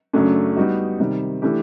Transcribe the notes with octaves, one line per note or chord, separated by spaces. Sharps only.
F#2 C#3 F#3 A3 D4
G3 B3 D#4 F#4
C3 D#3 G3
E3 A3 D4 G4